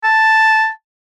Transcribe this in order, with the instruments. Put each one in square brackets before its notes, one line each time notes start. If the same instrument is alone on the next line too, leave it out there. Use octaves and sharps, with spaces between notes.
[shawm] A5